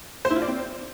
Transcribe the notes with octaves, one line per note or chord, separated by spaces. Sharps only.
C5
E4
F4
D5
C4